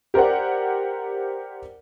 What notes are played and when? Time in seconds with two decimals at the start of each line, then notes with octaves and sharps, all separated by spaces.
0.14 G4 A#4 C5 D5 F#5